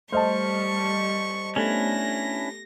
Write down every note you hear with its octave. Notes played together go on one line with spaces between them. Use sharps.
G3 A3 C5 D#5 A5 C#6 F6
A3 B3 C#4 D4 E4 G4 A#6